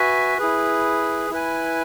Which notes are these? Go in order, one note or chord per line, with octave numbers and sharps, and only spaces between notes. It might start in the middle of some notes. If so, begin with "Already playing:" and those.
Already playing: F#4 B4 E5 G#5
E4 G#4 B4
E4 B4 G#5